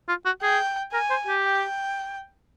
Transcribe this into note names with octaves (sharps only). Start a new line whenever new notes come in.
F4
F#4
G#4 G5
A#4 G#5
C5
G4
G5